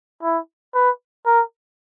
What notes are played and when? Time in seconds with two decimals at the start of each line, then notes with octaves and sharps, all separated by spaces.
0.23 E4
0.74 B4
1.26 A#4